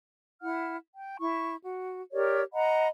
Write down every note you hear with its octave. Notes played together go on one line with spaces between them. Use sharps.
E4 F#5 F6
G5
E4 C#6
F#4
G4 A#4 C#5 D5
D#5 F#5 A#5 B5